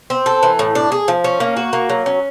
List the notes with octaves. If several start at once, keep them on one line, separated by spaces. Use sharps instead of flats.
C4
A4
E3
A2
D4
G#4
F3
C#4
A#3
F#4
A#3
F#3
C#4